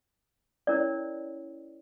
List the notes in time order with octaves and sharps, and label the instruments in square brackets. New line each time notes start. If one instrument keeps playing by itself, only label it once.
[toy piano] C#4 E4 A#4 C#5 D5